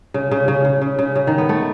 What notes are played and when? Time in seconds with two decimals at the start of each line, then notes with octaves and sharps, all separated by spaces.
0.14 C#3
0.31 C#3
0.48 C#3
0.65 C#3
0.82 C#3
0.99 C#3
1.16 C#3
1.27 D#3
1.38 B3
1.49 A3